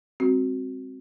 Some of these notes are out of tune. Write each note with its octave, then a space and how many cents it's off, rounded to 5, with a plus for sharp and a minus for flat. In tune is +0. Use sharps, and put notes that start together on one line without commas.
G#3 -45 C4 +0 F#4 +0